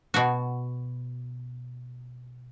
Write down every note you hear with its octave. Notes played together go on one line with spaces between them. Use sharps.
B2 F#4